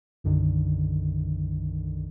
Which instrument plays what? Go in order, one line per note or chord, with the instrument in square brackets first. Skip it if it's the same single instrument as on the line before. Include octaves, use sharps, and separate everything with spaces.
[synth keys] B1 F#2 D3 D#3